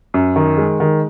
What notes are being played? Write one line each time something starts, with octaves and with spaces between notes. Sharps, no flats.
F#2
D#3
G#3
D#3